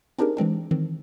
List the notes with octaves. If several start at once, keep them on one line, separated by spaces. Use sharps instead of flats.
C4 D4 D#4 G4 G#4 A#4
E3 G#3 C4 D4
D#3 E3 C4